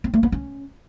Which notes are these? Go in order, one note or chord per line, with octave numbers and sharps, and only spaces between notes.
C4
A3
B3
C#4